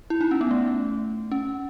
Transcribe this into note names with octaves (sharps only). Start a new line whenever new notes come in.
E4
D#4
C#4
B3
A3
C#4